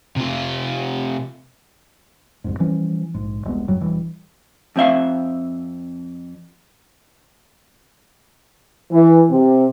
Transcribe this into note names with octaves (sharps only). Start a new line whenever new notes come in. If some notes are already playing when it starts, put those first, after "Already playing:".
C3 F4
C2 F2 G#2
E3 F3 G3 C#4
A#1 G#2
E1 C2 G#3 B3
G#1 F#2 F#3 G3
E1 E3 G3
F2 C4 E5 F5
E3
C3